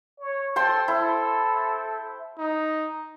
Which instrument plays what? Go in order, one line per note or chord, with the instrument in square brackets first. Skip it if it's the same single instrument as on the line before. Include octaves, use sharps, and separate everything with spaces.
[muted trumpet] C#5
[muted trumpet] A4 [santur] C5 G5 C6
[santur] E4 [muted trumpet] A4
[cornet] D#4